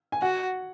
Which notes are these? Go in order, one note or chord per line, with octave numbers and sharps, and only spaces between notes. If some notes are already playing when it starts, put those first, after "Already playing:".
G#5
F#4 F#5